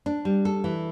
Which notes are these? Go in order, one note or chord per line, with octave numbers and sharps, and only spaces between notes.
D4
G3
A4
E3